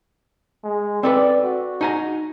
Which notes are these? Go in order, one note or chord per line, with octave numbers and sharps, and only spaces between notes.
G#3
C4 A4 B4 D5
F#4
D#4 G#5 A#5